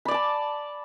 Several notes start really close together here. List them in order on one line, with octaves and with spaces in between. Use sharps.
B5 D5 D6 A5